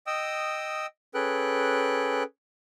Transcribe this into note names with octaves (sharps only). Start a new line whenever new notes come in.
D#5 G5 D#6 E6
C#4 G#4 A4 B4 G5 F#6